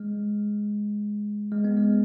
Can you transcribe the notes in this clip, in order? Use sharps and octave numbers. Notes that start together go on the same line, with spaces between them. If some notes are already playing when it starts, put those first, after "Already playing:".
Already playing: G#3
G#3
B3
G#3